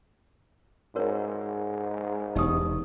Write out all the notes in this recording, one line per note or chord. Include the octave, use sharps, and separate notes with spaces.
G#2 F#4 A#4 C#5
E1 D#4 G4 D#6